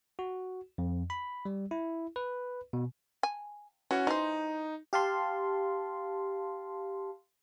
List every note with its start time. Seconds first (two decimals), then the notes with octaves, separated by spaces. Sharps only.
0.19 F#4
0.78 F2
1.10 B5
1.45 G3
1.71 E4
2.16 B4
2.73 B2
3.23 G#5
3.91 E3 C#4 F#4
4.07 E3 D#4 C5
4.93 G4 F5 A5 C6